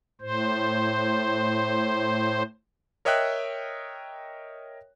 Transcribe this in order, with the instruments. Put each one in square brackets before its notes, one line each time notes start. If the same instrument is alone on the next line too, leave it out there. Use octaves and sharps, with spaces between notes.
[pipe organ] A2 C5
[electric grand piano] A#4 C#5 D#5 E5 G5 F#6